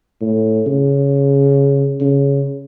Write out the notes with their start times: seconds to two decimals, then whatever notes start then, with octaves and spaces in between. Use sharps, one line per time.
0.21 A2
0.67 C#3
2.01 C#3